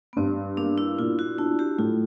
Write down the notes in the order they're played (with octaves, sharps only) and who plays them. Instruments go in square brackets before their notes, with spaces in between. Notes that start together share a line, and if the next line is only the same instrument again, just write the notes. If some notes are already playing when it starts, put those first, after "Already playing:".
[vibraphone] B3
[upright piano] G2 [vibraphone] C4
[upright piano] A#3 [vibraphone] D4
[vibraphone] E4
[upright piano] A#2 [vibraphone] F4
[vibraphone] F#4
[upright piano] D4 [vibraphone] E4
[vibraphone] G4
[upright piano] A2 [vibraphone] F4